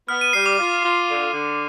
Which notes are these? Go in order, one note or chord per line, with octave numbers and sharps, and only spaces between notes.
B3 F6
D#7
G3 C7
D6
F4
F4
D3
D3